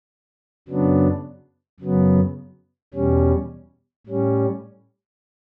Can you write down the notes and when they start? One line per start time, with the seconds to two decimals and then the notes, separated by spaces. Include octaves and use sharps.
0.68 F#2 C#3 F#3 B3 D4
1.80 F#2 C#3 F#3 B3
2.94 E2 B2 G3 C#4
4.07 A2 G3 C#4